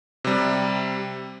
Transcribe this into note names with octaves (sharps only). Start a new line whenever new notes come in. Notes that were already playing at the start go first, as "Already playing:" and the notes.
C3 G3